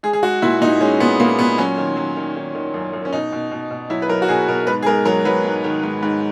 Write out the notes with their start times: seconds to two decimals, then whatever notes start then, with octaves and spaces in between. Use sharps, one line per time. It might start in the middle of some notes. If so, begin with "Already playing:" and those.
0.03 G#3 G#4
0.13 G#4
0.23 G#3 F#4
0.42 A#2 E4
0.61 A#2 D#4
0.81 G#3 C#4
1.00 A#2 B3
1.19 A#2 A#3
1.39 A#2 B3
1.58 F#3 C#4
1.77 D#3
1.97 F#3
2.16 D#3
2.36 D#3
2.55 D#3
2.74 F#2
2.93 F#2
3.05 C#4
3.13 B2 D#4
3.32 B2
3.51 B2
3.71 B2
3.90 F#3 E4
4.02 B4
4.09 F#3 A#4
4.22 F#4
4.28 B2 G#4
4.48 B2 A#4
4.67 G#2 B4
4.83 G#4
4.86 G#2 A#4
5.05 F#3 A#4
5.25 F#3 B4
5.45 G#2
5.64 D#3
5.83 G#2
6.03 G#2